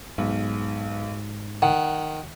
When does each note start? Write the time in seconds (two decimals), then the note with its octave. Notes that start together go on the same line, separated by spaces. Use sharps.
0.18 B1 G#2
1.62 D#3 F#5